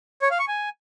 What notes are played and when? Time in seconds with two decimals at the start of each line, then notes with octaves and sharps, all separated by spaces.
0.22 C#5
0.31 F5
0.39 C#6
0.48 G#5